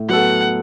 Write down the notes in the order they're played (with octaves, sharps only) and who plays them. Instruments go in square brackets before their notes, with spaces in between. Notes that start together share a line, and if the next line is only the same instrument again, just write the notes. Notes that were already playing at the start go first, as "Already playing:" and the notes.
Already playing: [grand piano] A2
[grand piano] F#3 B3 F#4 A4 [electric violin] F#5